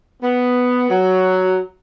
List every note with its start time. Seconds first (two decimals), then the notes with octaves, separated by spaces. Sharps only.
0.22 B3
0.89 F#3